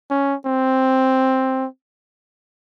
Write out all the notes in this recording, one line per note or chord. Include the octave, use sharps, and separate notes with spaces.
C#4
C4